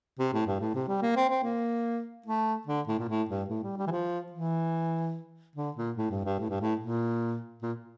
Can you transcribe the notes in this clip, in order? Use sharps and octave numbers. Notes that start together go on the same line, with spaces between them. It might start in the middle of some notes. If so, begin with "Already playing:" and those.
C3
A2
G2
A2
C3
G3
A#3
C4
C4
A#3
A3
D3
A2
A#2
A2
G2
A2
G3
G3
E3
F3
E3
D3
A#2
A2
G2
G2
A2
G2
A2
A#2
A#2